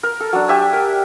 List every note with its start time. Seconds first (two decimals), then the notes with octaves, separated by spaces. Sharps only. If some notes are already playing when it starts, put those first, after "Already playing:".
0.03 A#4
0.20 A4
0.33 F#3 D4
0.48 G4 E5 G#5
0.73 A#4